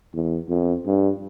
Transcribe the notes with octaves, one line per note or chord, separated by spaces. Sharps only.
E2
F2
G2